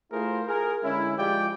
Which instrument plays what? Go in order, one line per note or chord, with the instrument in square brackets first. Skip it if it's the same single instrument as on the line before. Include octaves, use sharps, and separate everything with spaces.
[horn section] A3 E4 F4 G#4 A#4 C5
G#4 A#4
D3 G#3 C#4 E4
F3 G#3 F4 G4 D5 G5